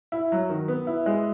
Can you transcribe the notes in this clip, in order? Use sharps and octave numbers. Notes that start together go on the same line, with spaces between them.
E4
F#3
D#3
B3
E4
G#3